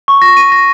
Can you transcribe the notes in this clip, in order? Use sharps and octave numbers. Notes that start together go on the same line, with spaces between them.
C#6
A#6
D#7
A#6